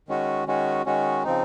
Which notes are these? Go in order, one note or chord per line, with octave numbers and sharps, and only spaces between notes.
D#3 G#3 C#4 F#4
D#3 G#3 C#4 F#4
D#3 G#3 C#4 F#4
C#3 F3 C4 D#4